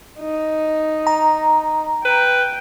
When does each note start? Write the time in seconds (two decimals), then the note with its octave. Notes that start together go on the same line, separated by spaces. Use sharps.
0.20 D#4
1.07 A#5
2.05 B4 G5